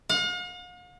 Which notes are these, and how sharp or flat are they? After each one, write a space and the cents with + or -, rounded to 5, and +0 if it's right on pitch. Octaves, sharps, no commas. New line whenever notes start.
F5 +45